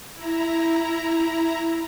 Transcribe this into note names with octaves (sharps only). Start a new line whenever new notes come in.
E4 A#5